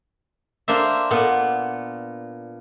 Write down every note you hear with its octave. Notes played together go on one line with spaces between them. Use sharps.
A#3 D4 C5 E5
A#2 B3